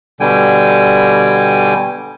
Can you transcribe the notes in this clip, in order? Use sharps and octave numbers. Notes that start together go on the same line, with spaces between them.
B2 D3 G3 G5 G#5